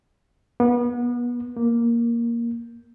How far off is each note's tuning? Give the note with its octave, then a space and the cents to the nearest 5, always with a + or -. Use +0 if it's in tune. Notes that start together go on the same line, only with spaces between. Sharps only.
B3 -30
A#3 +5